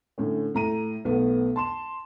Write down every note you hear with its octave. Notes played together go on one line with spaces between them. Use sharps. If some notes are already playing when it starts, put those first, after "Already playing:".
A2 D3 C#4
A2 A#5 D#7
B1 A3 B3
A5 C6 E7